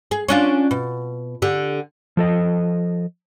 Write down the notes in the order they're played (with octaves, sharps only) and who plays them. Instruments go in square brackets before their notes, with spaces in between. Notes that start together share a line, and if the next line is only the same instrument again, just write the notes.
[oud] G#4
C#4 D4 F4
B2
D3 G4
[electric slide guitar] F3 A4 D#5